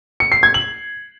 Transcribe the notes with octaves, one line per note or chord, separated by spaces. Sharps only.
C#7
C7
G#6
F#7